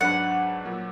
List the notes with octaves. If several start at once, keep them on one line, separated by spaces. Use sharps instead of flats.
G#2 F#3 D4 F#4 B4 F#5
A#2 F#3 A#3